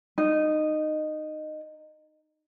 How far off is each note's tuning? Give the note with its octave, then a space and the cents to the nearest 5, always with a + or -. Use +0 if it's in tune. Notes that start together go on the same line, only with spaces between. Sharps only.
D#4 -15